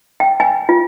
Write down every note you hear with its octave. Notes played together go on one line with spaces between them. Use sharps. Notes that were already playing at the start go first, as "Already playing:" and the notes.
G5
G#5
F4